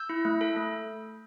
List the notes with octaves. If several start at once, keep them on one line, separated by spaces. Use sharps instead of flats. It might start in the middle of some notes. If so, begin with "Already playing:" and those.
Already playing: E6 G6
E4
A3
A4
A3